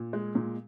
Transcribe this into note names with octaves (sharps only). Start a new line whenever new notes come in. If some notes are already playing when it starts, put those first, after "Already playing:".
Already playing: A#2
G#3
A#2